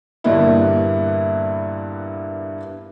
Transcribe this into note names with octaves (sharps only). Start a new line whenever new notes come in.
G2 A#2 D3 A#3 B3 E4